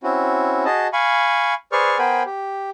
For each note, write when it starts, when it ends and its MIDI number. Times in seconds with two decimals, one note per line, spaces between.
0.03 0.65 60
0.03 0.65 61
0.03 0.65 64
0.03 0.65 66
0.65 0.87 66
0.65 0.87 68
0.65 0.87 75
0.65 0.87 81
0.93 1.54 77
0.93 1.54 80
0.93 1.54 83
0.93 1.54 85
1.72 1.98 68
1.72 1.98 71
1.72 1.98 72
1.72 1.98 74
1.72 1.98 85
1.72 1.98 89
1.99 2.23 59
1.99 2.23 70
1.99 2.23 72
1.99 2.23 79
1.99 2.23 80
1.99 2.23 83
2.26 2.70 67